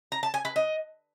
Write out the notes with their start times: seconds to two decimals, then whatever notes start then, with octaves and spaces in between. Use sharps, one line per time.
0.12 A#5
0.23 A5
0.34 G#5
0.45 B4
0.56 D#5